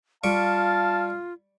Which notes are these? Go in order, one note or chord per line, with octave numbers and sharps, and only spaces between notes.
G3 F4 F5 A5 C#6